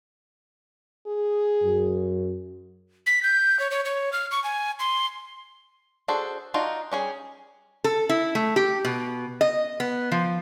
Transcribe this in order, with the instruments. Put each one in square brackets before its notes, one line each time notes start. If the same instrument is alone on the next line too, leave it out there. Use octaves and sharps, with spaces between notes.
[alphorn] G#4
[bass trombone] F#2
[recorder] B6
G6
C#5
C#5
C#5
F6
C#6
G#5
C6
[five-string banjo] D4 F#4 G#4 A4 C5
D4 D#4 F4 F#4 D5
G3 C#4 G#4
[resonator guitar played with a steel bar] A4
E4
A3
G4
B2
D#5
B3
F3